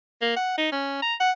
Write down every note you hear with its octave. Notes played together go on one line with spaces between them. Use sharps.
A#3
F#5
D#4
C#4
A#5
F#5